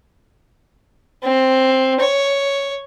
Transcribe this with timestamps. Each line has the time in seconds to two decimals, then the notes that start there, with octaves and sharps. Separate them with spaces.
1.23 C4
1.99 C#5